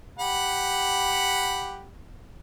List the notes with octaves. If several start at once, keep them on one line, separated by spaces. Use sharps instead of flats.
G4 F#5 B5